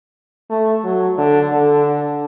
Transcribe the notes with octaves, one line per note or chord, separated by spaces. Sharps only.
A3
F#3
D3
D3